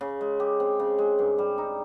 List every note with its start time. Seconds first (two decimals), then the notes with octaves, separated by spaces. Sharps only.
0.01 C#3
0.21 G#3
0.40 G4
0.60 C4
0.79 C#3
0.98 G#3
1.19 G2
1.38 G3
1.58 D#4